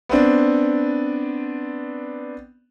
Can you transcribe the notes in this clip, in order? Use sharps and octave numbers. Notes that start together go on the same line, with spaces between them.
B3 C4 D4